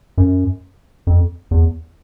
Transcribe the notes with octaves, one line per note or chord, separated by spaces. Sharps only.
F#2
F2
E2